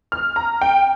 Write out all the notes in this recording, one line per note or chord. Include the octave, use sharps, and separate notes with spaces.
F6
A#5
G5